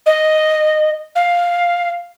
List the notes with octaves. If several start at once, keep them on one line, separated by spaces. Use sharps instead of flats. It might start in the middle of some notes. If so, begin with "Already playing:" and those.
D#5
F5